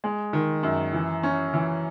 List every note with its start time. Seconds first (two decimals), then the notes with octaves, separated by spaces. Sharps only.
0.04 G#3
0.33 D#3
0.63 F#2
0.93 E3
1.23 C#4
1.54 E3